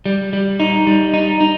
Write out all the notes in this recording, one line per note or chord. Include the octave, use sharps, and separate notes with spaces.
G3
G3
D#4
G3
D#4
D#4